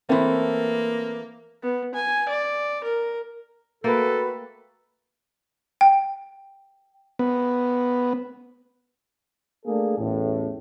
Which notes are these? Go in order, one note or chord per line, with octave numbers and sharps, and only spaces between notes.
E3 A3 A#3 C4
B3
G#5
D5
A#4
A3 A#3 F#4 A4 B4 G5
G5
B3
A3 A#3 D4 G#4 A4
A1 E2 A2